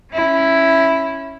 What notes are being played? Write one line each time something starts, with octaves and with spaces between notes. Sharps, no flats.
C#4 E4